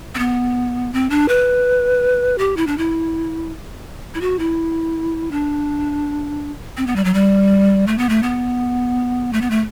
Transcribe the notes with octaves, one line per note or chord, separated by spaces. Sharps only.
C4
B3
C4
D4
B4
G4
E4
D4
E4
E4
F#4
E4
D4
C4
B3
G3
F#3
G3
A3
B3
A3
B3
A3
B3
A3